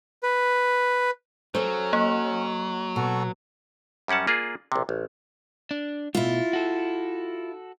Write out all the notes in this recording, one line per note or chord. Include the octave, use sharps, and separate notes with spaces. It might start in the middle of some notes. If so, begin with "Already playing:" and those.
B4
F#3 C#4 A4 C5
A#3
B2 F#4 A4
F#2 G3 C#4 F#5 A5
A#3 F4 G#4 D5
A#1 C3
A1
D4
B2 A3 E4 F4
F#4 A4